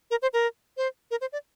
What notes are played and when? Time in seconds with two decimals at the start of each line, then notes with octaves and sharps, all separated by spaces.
0.11 A#4
0.22 C5
0.33 A#4
0.77 C5
1.11 A#4
1.21 C5
1.32 D5